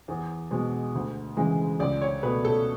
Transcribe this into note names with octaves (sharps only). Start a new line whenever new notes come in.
E2
B2 G#3
D2
C#3 E3 G#3
C#2 D5
C#5
B2 A3 B4
A4